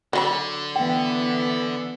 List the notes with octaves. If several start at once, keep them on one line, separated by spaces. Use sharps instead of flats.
D3 F#3 F4 B5
E3 B3 G5